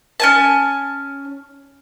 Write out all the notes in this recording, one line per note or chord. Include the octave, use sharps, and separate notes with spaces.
C#4 G#5 A5